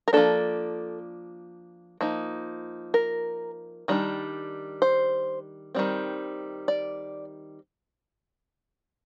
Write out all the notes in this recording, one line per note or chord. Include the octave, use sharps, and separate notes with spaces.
A#4
F3 A#3 D4 A4
F3 A#3 D#4
A#4
D#3 G3 D4
C5
D#3 G3 C4
D5